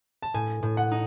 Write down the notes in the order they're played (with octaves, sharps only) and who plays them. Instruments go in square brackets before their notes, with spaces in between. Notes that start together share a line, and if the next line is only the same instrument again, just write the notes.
[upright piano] A5
[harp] A2 [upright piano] G#5
[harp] A2
[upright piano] F#5
[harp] D#4